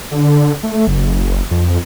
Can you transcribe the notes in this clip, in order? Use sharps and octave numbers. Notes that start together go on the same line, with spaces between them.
D3
A3
F#1
F2